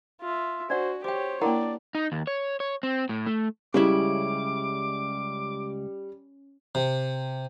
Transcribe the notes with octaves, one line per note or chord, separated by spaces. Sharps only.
F4 E5
D4 F#4 C5 D5 F#5
G4 C5 C#5 G5 D6
A#3 D4 E4 A#4 D5 F#5 A#5
D#4
D#2
C#5
C#5
C4
A2
A3
C#2 C#3 G3 C#4 E4 D6
C3